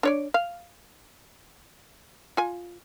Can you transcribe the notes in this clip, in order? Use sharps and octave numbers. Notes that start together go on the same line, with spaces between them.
D4 C#5 D5
F5
F4 G#5